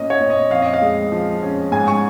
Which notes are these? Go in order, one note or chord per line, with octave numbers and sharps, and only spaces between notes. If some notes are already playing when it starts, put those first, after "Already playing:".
Already playing: A#2 A#3 C#4 D#5
C#5
A#2
D#5
F2 F5
D#5
F5
G#3
F3
C#4
G#2 G#5
C#6